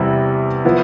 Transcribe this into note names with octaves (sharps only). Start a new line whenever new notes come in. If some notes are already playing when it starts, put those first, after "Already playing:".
Already playing: E2 C3 G3 B3 E4
F3 B3 E4